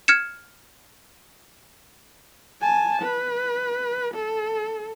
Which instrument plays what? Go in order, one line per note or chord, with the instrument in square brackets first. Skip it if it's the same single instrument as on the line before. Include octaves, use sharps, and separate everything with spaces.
[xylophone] F6 G#6 C#7 E7
[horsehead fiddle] G#5 A5
B4
A4